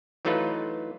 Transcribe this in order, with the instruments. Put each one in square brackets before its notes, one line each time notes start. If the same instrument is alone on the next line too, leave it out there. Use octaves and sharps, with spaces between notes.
[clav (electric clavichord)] E3 F#3 A3 D#4 F4 B4